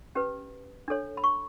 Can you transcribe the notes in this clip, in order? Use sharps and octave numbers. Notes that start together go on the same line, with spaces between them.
C#4 G4 B4
D4 A4 C#5
B5
C#6